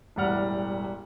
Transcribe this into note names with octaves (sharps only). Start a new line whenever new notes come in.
E1 A1 G3 F#5 F6